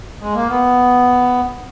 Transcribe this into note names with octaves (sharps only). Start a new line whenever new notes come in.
G#3
A#3
B3